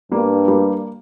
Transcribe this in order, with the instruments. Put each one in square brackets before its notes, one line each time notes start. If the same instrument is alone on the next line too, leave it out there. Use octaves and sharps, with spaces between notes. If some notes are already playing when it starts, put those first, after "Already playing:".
[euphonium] G2 [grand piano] G3 A#3
[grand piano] G3 A#3